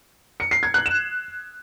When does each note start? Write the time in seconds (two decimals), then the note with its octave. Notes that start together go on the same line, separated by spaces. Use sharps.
0.40 C#7
0.51 C7
0.63 G#6
0.74 F#6
0.86 E7